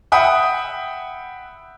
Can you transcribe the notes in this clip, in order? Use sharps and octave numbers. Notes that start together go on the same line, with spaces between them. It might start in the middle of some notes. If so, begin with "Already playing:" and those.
E5 F#5 G5 B5 D#6